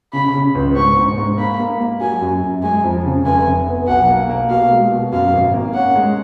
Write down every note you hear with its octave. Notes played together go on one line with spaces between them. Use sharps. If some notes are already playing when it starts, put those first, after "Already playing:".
C#3 B5
C#3
C#2
G#2 C#6
G#2
G#2
A#3 B5
A#3
A#3
F#3 G#5
F#2
F#2
G#3 G#5
F2
C#3
F1 G#5
F1
B3
B1 F#5
A#3
A#3
B2 F5
G#3
B2
F#2 F5
G#1
A#3
C#4 F#5
G#3